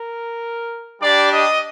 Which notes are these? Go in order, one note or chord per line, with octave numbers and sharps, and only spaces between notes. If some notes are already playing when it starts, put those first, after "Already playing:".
Already playing: A#4
G3 D4 G4 D5
D#5